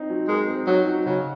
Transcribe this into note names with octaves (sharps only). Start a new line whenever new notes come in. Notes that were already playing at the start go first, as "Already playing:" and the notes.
Already playing: C4 D#4
F#3
G#3 A#4
C4
F#3 D#4
F#3
C#3 F#3